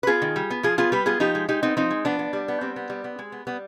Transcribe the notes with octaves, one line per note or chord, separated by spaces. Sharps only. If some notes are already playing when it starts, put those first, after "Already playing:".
B4
B3 F4 G#4
D#3
G3
B3
F3 F4 G#4
B3 F4 G#4
G3 G4 B4
B3 F4 G#4
F3 D#4 G4
G#3
G#3 D#4 G4
B3 C4 D#4
F3 C4 D#4
G#3
F3 B3 D4
B3
G3
B3
G3 C4
B3
G3
B3
G#3
B3
G3 B3